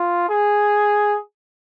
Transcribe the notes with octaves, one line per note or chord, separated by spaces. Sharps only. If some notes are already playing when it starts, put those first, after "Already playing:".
Already playing: F4
G#4